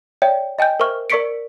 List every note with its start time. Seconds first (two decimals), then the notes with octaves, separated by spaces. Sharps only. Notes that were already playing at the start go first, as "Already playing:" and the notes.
0.22 C#5 D5 E5 G5
0.59 D#5 G5 G#5 G6
0.80 A#4 C5 E5 C#6 F6
1.10 A#4 D5 C#6 B6 C#7 D7